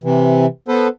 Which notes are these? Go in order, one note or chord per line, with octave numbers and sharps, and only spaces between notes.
C3 E3
B3 A4 B4 C5